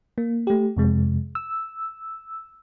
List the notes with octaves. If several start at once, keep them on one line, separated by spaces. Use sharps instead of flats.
A#3
A3 G4
F2 C3 G#3
E6